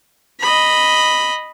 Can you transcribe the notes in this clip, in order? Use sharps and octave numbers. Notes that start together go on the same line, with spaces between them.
D#5 B5